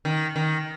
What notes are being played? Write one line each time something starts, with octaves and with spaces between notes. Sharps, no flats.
D#3
D#3